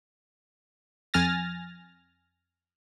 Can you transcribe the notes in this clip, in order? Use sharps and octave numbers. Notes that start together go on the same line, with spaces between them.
F2 G#5 F6 A6 A#6